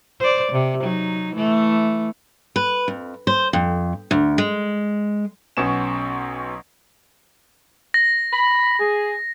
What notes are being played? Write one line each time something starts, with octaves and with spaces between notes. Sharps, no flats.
C5 D5
C3
F#3 D#4
E3 A3
B4
F2
C5
F2
D2
G#3
B1 B2 C#4 E7
A#6
B5
G#4